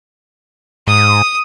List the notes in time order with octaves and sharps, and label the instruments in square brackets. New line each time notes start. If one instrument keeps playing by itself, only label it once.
[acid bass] G#2 [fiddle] D#6